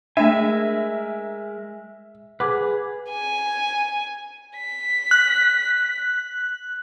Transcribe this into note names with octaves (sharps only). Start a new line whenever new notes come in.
G#3 A3 D4 A#4 E5 G#5
G#4 B4 F#5 D6
G#5
B6
F#6